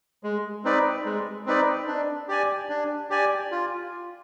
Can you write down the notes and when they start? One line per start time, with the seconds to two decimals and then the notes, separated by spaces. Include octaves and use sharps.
0.23 G#3
0.64 C4 D#4 B4 D5
1.05 G#3
1.46 C4 D#4 B4 D5
1.87 D4
2.28 G4 D5 G#5
2.69 D4
3.10 G4 D5 G#5
3.51 F4